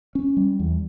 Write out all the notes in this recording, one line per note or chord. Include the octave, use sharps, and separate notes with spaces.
C#4
G3
E2